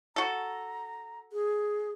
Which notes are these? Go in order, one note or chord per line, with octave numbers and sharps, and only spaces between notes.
F#4 A4 A#5
G#4